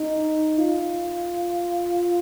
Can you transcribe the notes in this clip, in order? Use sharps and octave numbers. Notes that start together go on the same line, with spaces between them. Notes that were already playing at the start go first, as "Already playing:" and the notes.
Already playing: D#4
F4